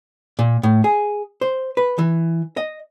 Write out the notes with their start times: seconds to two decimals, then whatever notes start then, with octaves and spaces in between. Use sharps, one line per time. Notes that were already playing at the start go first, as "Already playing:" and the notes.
0.39 A#2
0.63 A2
0.84 G#4
1.41 C5
1.77 B4
1.98 E3
2.57 D#5